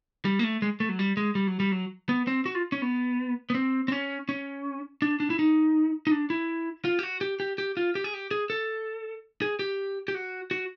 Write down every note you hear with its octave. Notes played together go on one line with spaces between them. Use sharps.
G3
A#3
A3
G#3
A3
F#3
G3
G#3
G3
F#3
G3
F#3
B3
C4
F#4
F4
C#4
B3
B3
C4
C4
C#4
C#4
D4
D4
E4
D#4
D#4
D4
E4
F4
G4
F#4
G4
G4
G4
F4
G4
G#4
G4
G#4
A4
G#4
G4
G4
F#4
F#4